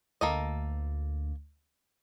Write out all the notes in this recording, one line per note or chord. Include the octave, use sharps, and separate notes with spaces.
D2 A#3 A4 D#5